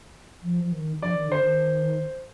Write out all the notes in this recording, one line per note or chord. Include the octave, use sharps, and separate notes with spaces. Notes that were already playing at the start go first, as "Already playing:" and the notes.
F3
F3
D#3
F3 D5
D#3
D3 C5
D#3